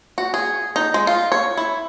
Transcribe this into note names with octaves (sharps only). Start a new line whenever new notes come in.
F#4
G#4
D#4
G#3
F4
C#5
E4